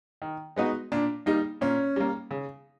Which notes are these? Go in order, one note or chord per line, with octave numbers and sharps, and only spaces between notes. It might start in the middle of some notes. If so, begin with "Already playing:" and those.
D#3
G#3 B3 D#4 F#4
A#2 D4
G3 A#3 D#4
A#2 C#4
G3 A#3
C#3